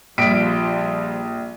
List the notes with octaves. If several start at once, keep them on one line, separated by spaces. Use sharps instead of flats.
A#1 F3 G3 B6 D7